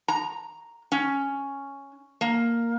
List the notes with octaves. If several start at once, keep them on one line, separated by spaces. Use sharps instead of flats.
A#5
C#4
A#3